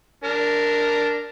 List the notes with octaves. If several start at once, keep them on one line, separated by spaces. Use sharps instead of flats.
D4 A#4